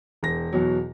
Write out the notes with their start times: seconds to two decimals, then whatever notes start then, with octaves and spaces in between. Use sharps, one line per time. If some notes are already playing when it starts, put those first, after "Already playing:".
0.23 E1 A#6
0.53 E2 B2 F#3